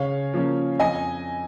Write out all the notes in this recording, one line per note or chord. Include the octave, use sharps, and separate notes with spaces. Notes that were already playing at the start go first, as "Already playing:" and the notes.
Already playing: C#3 C#5 F5
F3 A#3 C#4
F2 D#5 G#5